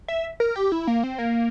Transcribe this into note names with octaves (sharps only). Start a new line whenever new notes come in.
E5
A#4
G4
E4
A#3
C4
A#3